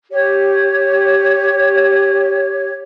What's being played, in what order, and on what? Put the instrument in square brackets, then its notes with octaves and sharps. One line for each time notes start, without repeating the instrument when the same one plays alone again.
[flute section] G4 C#5